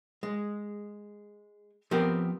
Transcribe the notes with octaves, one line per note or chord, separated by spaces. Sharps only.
G#3
F3 B3 C4 G4 A#4